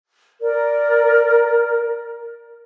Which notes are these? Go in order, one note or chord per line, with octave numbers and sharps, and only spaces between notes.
A#4 D5